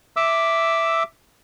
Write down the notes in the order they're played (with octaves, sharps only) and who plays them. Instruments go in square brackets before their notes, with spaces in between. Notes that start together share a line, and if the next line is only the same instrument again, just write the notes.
[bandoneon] E5 D6 E6